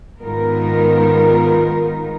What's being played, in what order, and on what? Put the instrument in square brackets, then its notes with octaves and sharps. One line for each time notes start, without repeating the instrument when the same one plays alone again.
[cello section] G#2 D#3 B3 D#4 F4 A#4